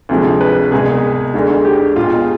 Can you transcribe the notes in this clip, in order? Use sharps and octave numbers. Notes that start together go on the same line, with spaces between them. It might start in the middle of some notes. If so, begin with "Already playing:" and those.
D2 C3 F3 G#3
B4
C2 B2 G#3 G#4
D2 D3 G#3
G4
B1 B2 G#3 F4